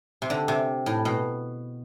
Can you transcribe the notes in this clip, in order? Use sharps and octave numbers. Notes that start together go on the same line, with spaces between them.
C3
D3
C3
A2
B2